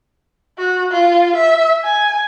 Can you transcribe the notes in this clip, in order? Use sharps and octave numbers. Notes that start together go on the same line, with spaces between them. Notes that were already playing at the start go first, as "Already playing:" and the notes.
F#4
F4
E5
G#5